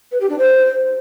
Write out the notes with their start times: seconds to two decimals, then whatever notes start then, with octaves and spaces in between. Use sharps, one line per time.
0.11 B4
0.20 G4
0.29 D4
0.38 C5